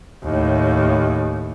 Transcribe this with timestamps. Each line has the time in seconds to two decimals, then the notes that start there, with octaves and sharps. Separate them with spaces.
0.24 D#2 A2